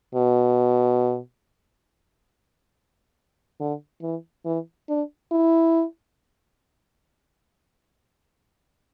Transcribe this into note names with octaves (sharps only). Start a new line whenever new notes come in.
B2
D3
E3
E3
D4
E4